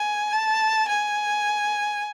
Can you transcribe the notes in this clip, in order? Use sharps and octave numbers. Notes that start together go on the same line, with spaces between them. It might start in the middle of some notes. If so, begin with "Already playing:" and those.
Already playing: G#5
A5
G#5